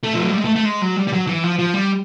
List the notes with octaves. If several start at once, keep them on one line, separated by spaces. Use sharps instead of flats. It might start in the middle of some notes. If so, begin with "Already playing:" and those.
A3
F3
F#3
G3
G#3
A3
A3
G#3
F#3
G3
G3
F#3
E3
F3
F3
G3